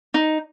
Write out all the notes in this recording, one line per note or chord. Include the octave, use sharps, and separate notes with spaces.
D#4